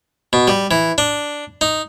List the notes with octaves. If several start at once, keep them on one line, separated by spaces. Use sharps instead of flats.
B2
G3
E3
D4
D#4